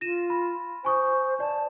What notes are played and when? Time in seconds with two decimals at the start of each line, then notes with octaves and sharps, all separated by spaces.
0.01 F4 A#6 D#7 E7
0.30 B5
0.84 C5 G#5 C#6 D#6
1.40 D5 A5